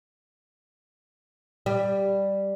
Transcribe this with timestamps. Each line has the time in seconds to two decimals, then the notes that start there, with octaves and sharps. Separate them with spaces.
1.66 G3